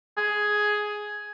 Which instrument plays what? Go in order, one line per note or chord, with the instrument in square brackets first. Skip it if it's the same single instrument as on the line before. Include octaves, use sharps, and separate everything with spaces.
[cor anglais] G#4